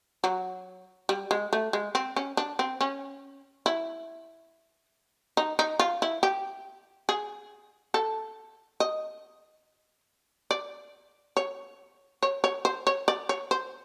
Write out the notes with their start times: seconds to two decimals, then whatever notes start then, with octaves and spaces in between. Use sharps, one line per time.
0.24 F#3
1.09 G3
1.31 G#3
1.53 A3
1.73 G#3
1.95 C4
2.16 C#4
2.37 D4
2.59 C4
2.81 C#4
3.66 E4
5.37 D#4
5.59 D#4
5.79 F4
6.02 E4
6.23 G4
7.09 G#4
7.94 A4
8.80 D#5
10.51 D5
11.37 C#5
12.23 C#5
12.44 C#5
12.65 C5
12.87 C#5
13.08 D5
13.29 C#5
13.51 C5